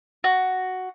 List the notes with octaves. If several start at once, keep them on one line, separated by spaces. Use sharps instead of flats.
F#4